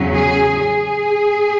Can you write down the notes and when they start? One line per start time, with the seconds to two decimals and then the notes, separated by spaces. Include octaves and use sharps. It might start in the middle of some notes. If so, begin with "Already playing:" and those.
Already playing: E2 C#3 F#3 A3 C#4
0.14 G#4
0.59 G#4